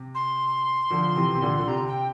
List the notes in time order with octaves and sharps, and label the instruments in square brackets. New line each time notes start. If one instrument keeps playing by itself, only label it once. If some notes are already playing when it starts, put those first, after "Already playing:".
Already playing: [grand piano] C3
[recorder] C6
[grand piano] D3 F3
C3 E3
C3
A#2 D3
D3
[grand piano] C3 [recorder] A#5
[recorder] G5